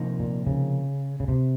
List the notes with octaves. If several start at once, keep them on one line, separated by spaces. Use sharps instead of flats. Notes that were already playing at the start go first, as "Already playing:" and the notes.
Already playing: C3 F3 A#3 D#4
A#2
C#3
C#3
C3